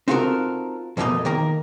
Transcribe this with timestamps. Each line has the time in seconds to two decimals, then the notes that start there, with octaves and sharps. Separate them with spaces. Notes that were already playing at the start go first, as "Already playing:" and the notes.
0.08 C4 D#4 F4 F#4 A4 A#4
0.97 F2 B2 D#3 A3 A#3 D#5
1.25 D#3 A#3 A#4